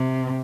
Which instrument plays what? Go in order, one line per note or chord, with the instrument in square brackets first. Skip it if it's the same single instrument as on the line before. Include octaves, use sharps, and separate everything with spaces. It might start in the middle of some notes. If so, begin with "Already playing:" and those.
Already playing: [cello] C3